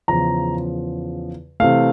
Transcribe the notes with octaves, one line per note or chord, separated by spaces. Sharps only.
E2 C#3 F3 A#5
C3 E3 A3 F5